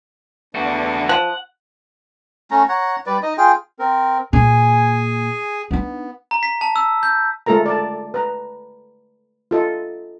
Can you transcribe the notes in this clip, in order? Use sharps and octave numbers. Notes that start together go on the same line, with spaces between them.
E2 A3 B3 D4 F#4
F3 F#5
A3 C#4 A#5
C#5 F#5 A#5
G3 B4 D5
D#4 D#5
F4 G#4 G5
C4 A#4
A#2 A#3 G#4 G#5
B3 D4 D#4
A#5
B6
A5
E6
G6
G#3 A3 F4 A4 A#4 A#5
D5 A5
B4 A#5
F4 A4 D#5